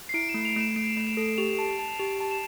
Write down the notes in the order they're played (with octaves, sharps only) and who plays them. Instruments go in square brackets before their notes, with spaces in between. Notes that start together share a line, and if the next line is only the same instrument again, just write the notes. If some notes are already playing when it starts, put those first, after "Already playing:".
[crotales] C7
[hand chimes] E4 [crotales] D7
[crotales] E7
[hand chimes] A3
[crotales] F7
[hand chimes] A3 [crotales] E7
[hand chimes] A3 [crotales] D7
[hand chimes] A3
[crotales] E7
[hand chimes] A4
[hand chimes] G4 [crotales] F7
[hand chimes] A5
A5
[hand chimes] G4 [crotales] F7
[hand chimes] A5
[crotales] E7